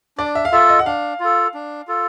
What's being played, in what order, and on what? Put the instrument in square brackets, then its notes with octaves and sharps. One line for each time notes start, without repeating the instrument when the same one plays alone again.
[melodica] D4 [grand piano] D5
[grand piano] E5
F5
[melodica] F4 A4 [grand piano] E5
[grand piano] D#5
F#5
[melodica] D4 [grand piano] F5
[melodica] F4 A4
D4
F4 A4